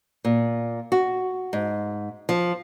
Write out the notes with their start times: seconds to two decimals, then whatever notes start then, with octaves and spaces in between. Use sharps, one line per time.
0.25 A#2
0.92 F#4
1.53 G#2
2.29 F3